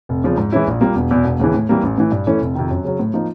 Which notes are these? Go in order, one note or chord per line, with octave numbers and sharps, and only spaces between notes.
F1
E2 C#3 F3
G#2
E3 G#3 C#4 E4
A#1
A#2 G3 A#3
E1
E2 B2
E1
D#2 C#3 E3
A2
E3 G3 A#3
A1
A2 E3
G2
E3 A3 C#4 E4
F1
F2 C3 D#3
F#2
C#3 F#3
A2
F3 A#3 D#4